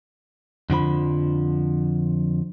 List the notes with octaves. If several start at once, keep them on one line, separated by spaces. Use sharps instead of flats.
F2 D3 F3 B5